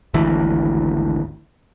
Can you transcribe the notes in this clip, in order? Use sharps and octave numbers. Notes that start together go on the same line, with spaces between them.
G#1 D2 E3